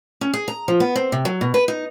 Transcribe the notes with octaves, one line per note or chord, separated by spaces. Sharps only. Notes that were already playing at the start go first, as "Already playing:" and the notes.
C#4
G#4
A#5
F3
B3
C4
C3
F#3
B2
B4
D#4